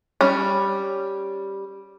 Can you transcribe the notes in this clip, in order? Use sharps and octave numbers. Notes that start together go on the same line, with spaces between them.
G3 C#4